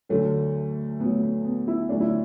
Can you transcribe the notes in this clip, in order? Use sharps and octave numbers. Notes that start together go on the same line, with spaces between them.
D2 D3 F#3 A3
D2 D3 F#3 B3
B3
B3
E4
D2 D3 F#3 D4
E4